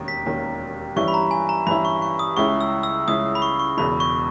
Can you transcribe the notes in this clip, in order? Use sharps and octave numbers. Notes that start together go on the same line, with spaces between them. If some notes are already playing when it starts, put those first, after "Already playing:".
Already playing: E1 D#2 D#3 A#3 C#4
B6
E1 D#2 D#3 A#3 C#4
G2 E3 G3 C#4 E4 C#6
B5
A#5
G#5
A#5
G2 E3 G3 C#4 E4 B5
C#6
C#6
D#6
C#2 C#3 G#3 C#4 E4 C#6
E6
E6
C#2 C#3 G#3 C#4 E4 D#6
B5
C#6
C#6
E1 E2 C#3 E3 B5
C#6